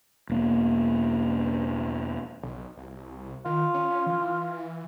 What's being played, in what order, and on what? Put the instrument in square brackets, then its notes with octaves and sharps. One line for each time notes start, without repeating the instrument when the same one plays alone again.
[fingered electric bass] E1 A#3
[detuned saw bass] B1
C2
[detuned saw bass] D#3 [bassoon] F4
[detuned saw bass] C#4
E3